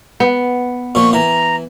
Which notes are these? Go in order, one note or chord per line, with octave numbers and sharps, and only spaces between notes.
B3
A#2 F3 C#6
E3 A#5